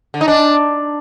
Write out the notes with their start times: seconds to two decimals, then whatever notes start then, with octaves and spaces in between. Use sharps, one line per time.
0.14 D3
0.21 D#4
0.28 D4